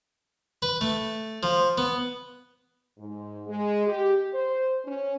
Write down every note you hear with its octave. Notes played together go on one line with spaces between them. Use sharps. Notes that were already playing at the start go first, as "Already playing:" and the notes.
B4
A3
F3
B3
G#2
G#3
G4
C5
C#4